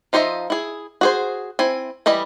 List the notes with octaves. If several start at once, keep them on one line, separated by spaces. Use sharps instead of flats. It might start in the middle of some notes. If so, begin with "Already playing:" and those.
F3 D#4 C5 D#5 E5
E4 G#4
F#4 G#4 C5
C4 E4 G#5
E3 G3 D#5 B5